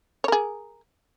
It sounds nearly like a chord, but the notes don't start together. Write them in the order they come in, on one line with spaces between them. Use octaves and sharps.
C#5 A#4 G#4